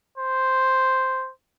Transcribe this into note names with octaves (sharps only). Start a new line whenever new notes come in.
C5